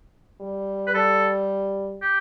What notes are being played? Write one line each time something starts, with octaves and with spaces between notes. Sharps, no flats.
G3
B4
G3 A4
G4